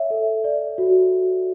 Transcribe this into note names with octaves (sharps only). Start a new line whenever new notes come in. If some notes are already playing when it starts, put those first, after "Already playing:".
Already playing: C#5 E5
A4
D5
F#4